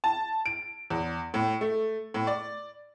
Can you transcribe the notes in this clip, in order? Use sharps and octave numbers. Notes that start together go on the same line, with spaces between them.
A5
D7
E2
A2
A3
A2
D5